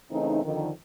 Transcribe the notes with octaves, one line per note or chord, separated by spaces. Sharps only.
C#3 E3 A3 C4 D#4
F2 D3 D#3